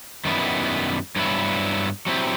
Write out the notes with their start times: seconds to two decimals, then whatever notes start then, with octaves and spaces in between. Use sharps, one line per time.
0.25 F#2 D#3 G3 B3 E4
1.16 G2 F#3 B3 E4
2.06 F#3 C4 E4 G4